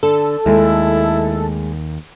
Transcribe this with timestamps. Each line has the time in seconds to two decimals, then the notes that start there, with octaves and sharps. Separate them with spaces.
0.03 D3 A4
0.46 D#2 G#3 A3 E4